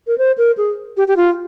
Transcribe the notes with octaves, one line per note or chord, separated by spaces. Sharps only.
A#4
C5
A#4
G#4
G4
G4
F4